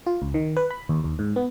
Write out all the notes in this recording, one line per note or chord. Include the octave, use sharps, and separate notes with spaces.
F4
C#2
D#3
B4
B5
D#2
D#2
G#2
B3